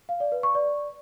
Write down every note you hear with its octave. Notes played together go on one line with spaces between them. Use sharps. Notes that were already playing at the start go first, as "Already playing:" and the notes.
F5
D5
B4
C#6
D5